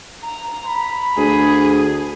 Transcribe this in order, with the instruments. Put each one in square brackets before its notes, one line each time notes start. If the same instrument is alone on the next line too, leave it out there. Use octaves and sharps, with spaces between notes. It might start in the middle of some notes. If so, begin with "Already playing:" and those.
[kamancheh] A#5
[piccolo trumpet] B5
[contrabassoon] D2 [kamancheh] G#4